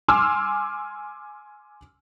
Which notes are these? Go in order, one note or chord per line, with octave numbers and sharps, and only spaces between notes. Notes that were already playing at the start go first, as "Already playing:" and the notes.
G#5 C6 D6 E6 F6